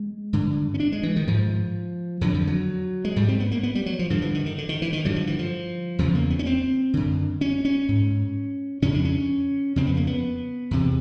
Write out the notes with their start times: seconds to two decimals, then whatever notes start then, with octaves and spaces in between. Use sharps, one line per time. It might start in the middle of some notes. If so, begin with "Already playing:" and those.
Already playing: G#3
0.33 G2 D3
0.74 C#4
0.80 D4
0.92 G#3
1.03 E3
1.16 D#3
1.27 G#2 F3
2.21 F2 D3 F#3
2.34 F3
2.47 F#3
3.05 G#3
3.16 G#2 G3
3.28 C4
3.40 B3
3.51 A#3
3.63 B3
3.75 G3
3.86 F#3
3.99 F3
4.10 G2 D3 F3
4.22 E3
4.34 D#3
4.46 D#3
4.58 D3
4.69 D#3
4.82 E3
4.93 D#3
5.05 G2 D3 F#3
5.16 F3
5.27 E3
5.39 F3
5.99 E2 C#3 F3
6.15 A#3
6.30 B3
6.39 C#4
6.46 C4
6.94 F#2 D3
7.41 C#4
7.65 C#4
7.88 G#2
8.82 F2 C#3 C#4
8.94 D4
9.05 C#4
9.76 F2 C#3 C4
9.87 B3
9.97 A#3
10.07 B3
10.71 E2 C3